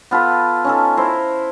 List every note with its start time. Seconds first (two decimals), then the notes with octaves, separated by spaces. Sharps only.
0.11 B3 F4 A4 B4
0.65 C#4 D#4 A4
0.97 E4 C5 A#5